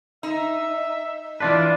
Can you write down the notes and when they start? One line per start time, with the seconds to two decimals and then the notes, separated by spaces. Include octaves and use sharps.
0.23 D#4 E5
1.40 E3 D4 F4 B4 D5